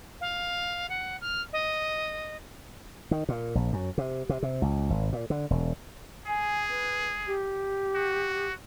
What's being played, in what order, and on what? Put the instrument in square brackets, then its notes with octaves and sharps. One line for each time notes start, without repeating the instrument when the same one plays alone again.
[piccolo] F5
F#5
F6
D#5
[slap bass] D#3
A#2
A#1
F#2
C3
C3
C3
C#2
G#1
A#2
D3
E1
[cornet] G#4 [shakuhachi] G#5
[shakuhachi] B4
G4
[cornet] F#4